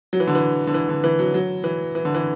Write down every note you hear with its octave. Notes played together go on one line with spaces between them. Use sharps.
F#3
E3
D3
E3
D3
E3
D3
E3
F#3
F#3
E3
E3
D3
E3